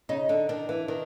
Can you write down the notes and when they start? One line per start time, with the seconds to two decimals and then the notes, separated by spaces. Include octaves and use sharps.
0.09 C#3 D#4
0.29 D3
0.49 D#3 D4
0.69 E3
0.88 D#3 D4